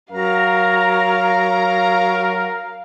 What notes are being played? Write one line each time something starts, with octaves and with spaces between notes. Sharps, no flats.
F#3 A#4 F5 A#5